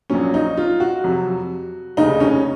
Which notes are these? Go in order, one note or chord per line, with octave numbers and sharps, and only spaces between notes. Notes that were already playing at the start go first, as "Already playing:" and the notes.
A#1 A#2 F#3 C#4
D#4
F4
F#4
F2 C3 F#3
F1 D#2 C#3 D#4
C#4